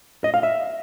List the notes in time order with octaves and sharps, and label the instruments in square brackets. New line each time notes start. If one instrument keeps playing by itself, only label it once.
[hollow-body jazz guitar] D#5
F5
E5